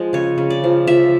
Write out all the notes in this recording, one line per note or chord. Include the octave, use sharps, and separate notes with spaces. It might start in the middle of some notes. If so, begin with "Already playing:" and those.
Already playing: F3 G#3
C#3 C#5
C#3
D5
F3
F3 E5